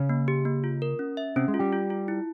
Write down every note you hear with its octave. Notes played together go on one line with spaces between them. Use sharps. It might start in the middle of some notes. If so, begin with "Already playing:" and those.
Already playing: C#3 C#4
A#3
G4
A#3
F4
A#4
C#4
E5
C3 C4 C#4
G#3
F4
G3 G4
F4
F4
E4